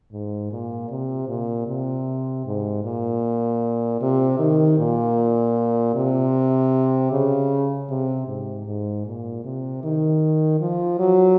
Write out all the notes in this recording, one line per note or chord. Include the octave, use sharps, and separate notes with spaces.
G#2
A#2
C3
A#2
C3
G#2
A#2
C3
D#3
A#2
C3
C#3
C3
G#2
G#2
A#2
C3
D#3
F3
F#3